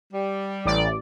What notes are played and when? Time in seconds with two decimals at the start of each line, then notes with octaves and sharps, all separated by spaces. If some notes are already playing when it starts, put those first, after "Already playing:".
0.13 G3
0.65 A1 D5